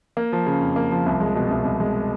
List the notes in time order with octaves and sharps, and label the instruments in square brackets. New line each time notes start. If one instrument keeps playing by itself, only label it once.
[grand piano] A#3
F3
C#3
F2
A#3
F3
C2
G#3
B2
C2
C2
G#3